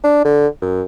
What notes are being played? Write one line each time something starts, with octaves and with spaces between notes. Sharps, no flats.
D4
D3
F#2